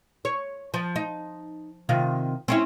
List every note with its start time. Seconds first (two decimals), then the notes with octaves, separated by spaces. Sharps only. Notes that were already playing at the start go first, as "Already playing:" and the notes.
0.25 C#5
0.74 F3
0.96 D#4
1.89 C3 D#3 F4
2.48 C4 C#4 E4